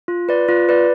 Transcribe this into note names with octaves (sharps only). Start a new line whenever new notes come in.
F4
B4 D5
F4
B4 D5